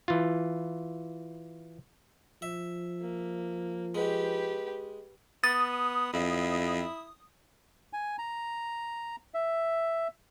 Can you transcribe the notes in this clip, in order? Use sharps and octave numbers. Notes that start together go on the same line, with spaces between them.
E3 F4
F3 E5
A#3
G#3 G4 B4
B3 D#6 A6
F2 E4
G#5
A#5
E5